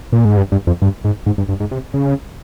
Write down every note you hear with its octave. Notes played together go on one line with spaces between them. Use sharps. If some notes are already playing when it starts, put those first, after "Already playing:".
A#2
G#2
G2
G2
F2
G2
G#2
G#2
G2
G2
G#2
C3
C#3